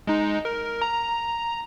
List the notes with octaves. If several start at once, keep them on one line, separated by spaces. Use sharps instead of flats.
G#3 D#4
A#4
A#5
A#5